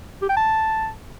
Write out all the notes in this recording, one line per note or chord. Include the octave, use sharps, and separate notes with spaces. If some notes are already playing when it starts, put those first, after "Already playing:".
G4
G5
A5